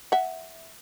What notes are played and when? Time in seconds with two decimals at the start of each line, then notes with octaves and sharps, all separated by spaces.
0.12 E5 F#5